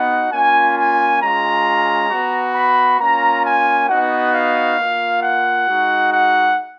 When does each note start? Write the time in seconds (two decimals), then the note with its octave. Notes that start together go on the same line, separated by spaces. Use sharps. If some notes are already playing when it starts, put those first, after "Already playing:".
Already playing: B3 D#4 F#4 F#5
0.31 A#3 C#4 F4 G#5
0.76 G#5
1.20 G#3 C#4 F4 A#5
2.10 B3 F#4
2.55 B5
2.99 A#3 C#4 F4 A#5
3.44 G#5
3.88 B3 D#4 F#4 F#5
4.33 F5
4.78 A#3 F4
5.22 F#5
5.67 G#3 D#4 F#4
6.11 F#5